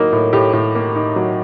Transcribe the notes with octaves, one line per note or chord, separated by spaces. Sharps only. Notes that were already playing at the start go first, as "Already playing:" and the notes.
Already playing: A2 F#3 A#3 D#4 A#4
A2
A2 G4
A2
A#3
D#4
F#3